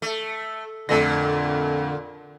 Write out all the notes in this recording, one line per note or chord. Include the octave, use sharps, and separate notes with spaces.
A3
F2 A#2 D3 A3 A#6